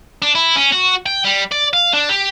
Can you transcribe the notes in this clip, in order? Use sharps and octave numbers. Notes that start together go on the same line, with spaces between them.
D4
E4
C#4
F#4
G5
G3
D5
F5
D4
G4